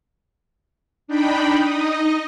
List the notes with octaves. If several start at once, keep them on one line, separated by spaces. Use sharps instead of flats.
D4 D#4 G5 B5
D#4 D#5